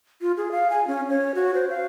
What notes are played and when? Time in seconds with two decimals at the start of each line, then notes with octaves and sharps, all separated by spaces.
0.21 F4
0.37 G#4
0.52 F5
0.70 G#5
0.87 C#4
1.09 C#5
1.35 F#4
1.54 C5
1.70 F5